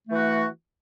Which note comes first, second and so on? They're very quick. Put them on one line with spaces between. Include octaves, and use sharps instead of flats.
A3 E3 F#4